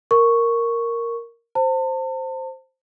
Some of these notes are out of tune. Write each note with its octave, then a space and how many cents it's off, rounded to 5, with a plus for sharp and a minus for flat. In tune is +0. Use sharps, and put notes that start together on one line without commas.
A#4 -5 C#6 +0
C5 +0 A5 +35